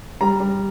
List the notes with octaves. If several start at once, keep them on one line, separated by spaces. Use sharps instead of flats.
G3 A#5
G3